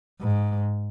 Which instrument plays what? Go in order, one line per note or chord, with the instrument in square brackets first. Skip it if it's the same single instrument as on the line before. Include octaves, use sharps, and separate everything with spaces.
[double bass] G#2